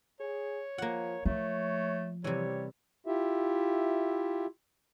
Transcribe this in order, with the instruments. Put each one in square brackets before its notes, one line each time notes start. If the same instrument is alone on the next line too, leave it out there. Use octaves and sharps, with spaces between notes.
[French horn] G#4 [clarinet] C#5
[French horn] F3 [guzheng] A#3 F#5
[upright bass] F3 [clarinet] A3 [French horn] C#5
[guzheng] C3 E3 [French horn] G3 [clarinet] C#5
[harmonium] E4 F4 G4 E5